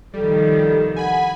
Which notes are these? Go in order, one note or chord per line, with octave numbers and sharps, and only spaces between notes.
C2 D#3 F3 G3 A4
F#5 G#5 B5